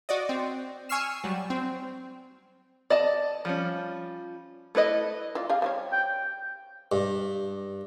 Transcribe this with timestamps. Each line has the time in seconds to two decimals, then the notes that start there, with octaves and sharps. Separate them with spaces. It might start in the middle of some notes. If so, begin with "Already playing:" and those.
0.09 F#4 D5 D#5
0.29 C4
0.89 G#5 C#6 E6 F6 C7 E7
1.24 F#3 G3
1.50 C4
2.90 D5 D#5 A5
3.45 F3 G3 C#4
4.75 A3 E4 B4 D#5
5.35 E4 F4 D5
5.49 G4 G#4 F5
5.62 G3 C4 C#5
5.92 G5
6.92 G2